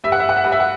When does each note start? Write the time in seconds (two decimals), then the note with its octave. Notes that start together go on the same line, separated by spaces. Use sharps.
0.04 G2 E5
0.12 F#5
0.20 E5
0.29 F#5
0.37 E5
0.44 G2 F#5
0.52 E5
0.60 F#5